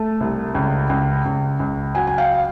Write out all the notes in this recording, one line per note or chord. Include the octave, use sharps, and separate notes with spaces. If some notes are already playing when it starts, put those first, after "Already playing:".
Already playing: A3 A5
C2
C#2
C#2
C#2
C#2
F#3 F#5 G#5
G#5
F5 G5